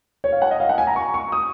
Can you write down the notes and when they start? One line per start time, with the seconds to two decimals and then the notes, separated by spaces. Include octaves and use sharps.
0.24 C#5
0.32 F5
0.42 F#5
0.51 D#5
0.60 F5
0.69 F#5
0.78 G#5
0.87 A#5
0.96 C#6
1.14 C#6
1.32 D#6